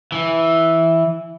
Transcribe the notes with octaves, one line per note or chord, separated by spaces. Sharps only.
E3